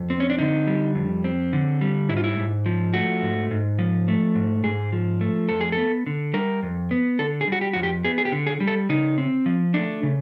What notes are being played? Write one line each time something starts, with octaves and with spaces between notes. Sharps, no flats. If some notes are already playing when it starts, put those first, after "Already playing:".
Already playing: F2
C4
C#4
D4
D3 D#4
G3
F2
C4
D3
G3
G#2 E4
F4
E4
G#2
F3
A3 F#4
G#2
G#2
F3
A3
G#2
G#2 G#4
F3
A3
F2 A4
G#4
B3 A4
D3
G3 A#4
F2
B3
D3 A4
G#4
G3 F#4
G4
F2 F#4
G4
B3 G#4
G#4
G4
D3
G#4
G3
A4
C#3 D#4
C4
F3
A3 D4
C#3